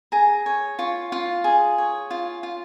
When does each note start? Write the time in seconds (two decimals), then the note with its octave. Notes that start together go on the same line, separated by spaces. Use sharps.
0.12 G#4 A#5
0.46 C#5
0.79 F4 C#6
1.12 F4
1.44 G#4
1.78 C#5
2.11 F4
2.43 F4